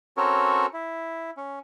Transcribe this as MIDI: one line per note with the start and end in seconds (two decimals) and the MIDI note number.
0.17 0.66 60
0.17 0.66 61
0.17 0.66 66
0.17 0.66 69
0.17 0.66 70
0.17 0.66 73
0.73 1.30 64
1.37 1.59 61